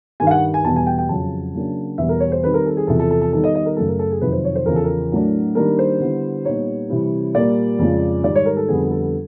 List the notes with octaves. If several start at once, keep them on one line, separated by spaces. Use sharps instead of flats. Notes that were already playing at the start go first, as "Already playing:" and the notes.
G2 D#3 G3 G#5
F5
F#5
G#5
E2 B2 G3 A5
G#5
G5
G5
F2 C#3 F#3 A5
C#3 F#3 A#3 D4
E2 B2 G3 E5
A#4
C#5
C5
D#3 G3 C4 B4
A#4
A4
G#4
E2 C3 F3 A4
A4
A4
A4
D#3 G3 B3 D#4 A4
D#5
D#5
A#4
F#2 C#3 F#3 A3 A4
A#4
A4
G#4
F2 C3 D#3 F#3 B4
C5
C#5
C5
E2 C#3 F3 A#4
A4
A#4
A2 F#3 A3 D4
D#3 G3 A#3 D4 A#4
C5
D3 G3 B3 E4
A#2 G3 B3 D#4 C#5
C3 E3 G3 C4 E4
A#2 G3 A#3 D5
F2 C#3 F3 G#3
G#2 D#3 G3 D5
C#5
A#4
A4
F2 D3 G3 B3 G#4
A4
A4
A4